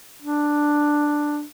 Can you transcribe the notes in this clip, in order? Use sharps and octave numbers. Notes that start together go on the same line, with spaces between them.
D4